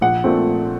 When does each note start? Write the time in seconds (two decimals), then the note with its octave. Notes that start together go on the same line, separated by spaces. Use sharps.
0.01 A#1 F#5
0.24 A#2 A3 C4